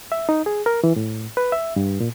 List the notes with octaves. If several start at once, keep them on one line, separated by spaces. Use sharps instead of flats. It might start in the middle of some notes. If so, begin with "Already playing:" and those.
E5
D#4
G#4
A#4
E3
A2
B4
E5
G2
A#2